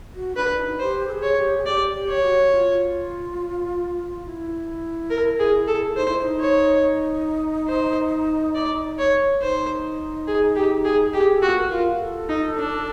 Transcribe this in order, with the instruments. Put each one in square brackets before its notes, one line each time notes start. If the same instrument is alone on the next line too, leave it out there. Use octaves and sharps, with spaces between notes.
[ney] F#4
[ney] D4 [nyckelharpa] B4
[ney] E4
D#4
[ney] G4 [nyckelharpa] C5
[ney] A4
G#4
[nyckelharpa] C#5
[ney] G4
G#4
[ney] G4 [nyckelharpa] D5
[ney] G4
[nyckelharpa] C#5
[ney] F#4
F4
E4
[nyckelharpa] A#4
G#4
A4
[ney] D#4 [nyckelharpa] C5
[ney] E4
E4
D#4
[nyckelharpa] C#5
C5
D5
C#5
[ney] D#4 [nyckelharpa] C5
[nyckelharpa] G#4
G4
G#4
[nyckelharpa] G4 [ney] G#4
[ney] A4
[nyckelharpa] F#4
[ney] A#4
[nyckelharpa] F4
[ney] A4
[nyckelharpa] D#4
D4